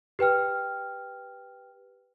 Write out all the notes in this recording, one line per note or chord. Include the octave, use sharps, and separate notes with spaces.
G4 B4 G5 F6